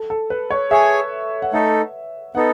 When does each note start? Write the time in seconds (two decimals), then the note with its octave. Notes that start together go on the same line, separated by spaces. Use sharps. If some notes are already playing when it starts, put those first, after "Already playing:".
Already playing: A4
0.10 A4
0.30 B4
0.50 C#5
0.71 G#4 C#5 E5 G#5
1.42 F#5
1.53 A3 D#4 A4 E5
2.35 B3 D#4 A4 F#5